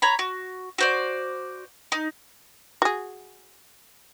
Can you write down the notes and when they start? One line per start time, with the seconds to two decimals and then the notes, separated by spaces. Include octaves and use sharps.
0.02 C#5 A#5 B5
0.19 F#4
0.78 F#4 C5 D5
1.92 D#4
2.82 F#4 G#4